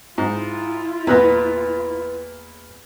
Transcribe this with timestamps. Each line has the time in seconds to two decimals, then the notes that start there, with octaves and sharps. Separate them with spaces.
0.18 G#2 E4 F4
1.07 E2 A#2 B3 B4 F#6 A#6